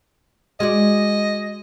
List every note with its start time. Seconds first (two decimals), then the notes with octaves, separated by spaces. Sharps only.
0.60 G#3 F#4 D5 D#5